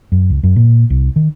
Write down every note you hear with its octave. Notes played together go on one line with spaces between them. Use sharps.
F#2
C#2
F#2
A#2
C2
D#3